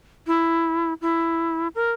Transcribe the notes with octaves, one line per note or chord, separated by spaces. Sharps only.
E4
E4
A#4